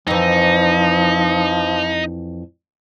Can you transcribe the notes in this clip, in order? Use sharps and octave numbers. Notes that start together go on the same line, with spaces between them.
F2 E3 F3 D#4